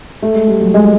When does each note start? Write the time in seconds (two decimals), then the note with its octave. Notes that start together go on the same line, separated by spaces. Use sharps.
0.22 A3
0.35 G#3
0.48 G3
0.61 F#3
0.74 G#3